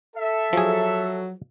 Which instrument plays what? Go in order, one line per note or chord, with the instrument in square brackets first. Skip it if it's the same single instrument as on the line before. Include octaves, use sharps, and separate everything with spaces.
[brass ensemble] A4 E5
[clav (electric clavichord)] F3 G#4 [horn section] F#3